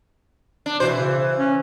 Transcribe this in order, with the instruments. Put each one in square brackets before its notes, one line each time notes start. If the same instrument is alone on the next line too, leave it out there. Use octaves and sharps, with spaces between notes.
[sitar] D4
[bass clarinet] B2 [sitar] E3 C5
[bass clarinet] C#3
C#4